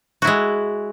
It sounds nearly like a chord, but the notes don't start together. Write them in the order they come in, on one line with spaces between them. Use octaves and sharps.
F#4 E4 G#3